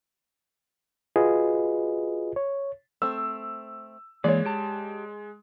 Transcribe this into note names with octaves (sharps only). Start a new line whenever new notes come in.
F4 F#4 G#4 B4 D#5
C#5
A3 C4 E6
E3 G#3 A#3 C#5 D5
G4 A5